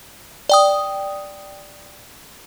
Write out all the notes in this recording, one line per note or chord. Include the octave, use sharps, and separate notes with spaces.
D5 G5 D#6